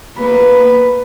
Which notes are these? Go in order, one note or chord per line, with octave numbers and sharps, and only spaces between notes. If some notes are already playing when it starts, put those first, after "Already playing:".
A#3 B4